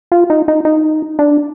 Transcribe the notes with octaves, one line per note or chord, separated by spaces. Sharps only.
F4
D#4
D#4
D#4
D4